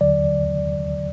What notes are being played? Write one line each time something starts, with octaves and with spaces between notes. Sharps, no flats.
D#2 D3 F#3 D5